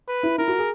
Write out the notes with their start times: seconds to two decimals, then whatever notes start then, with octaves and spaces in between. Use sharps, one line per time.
0.08 B4
0.23 E4
0.38 E4 A#4
0.48 F#4
0.59 G#4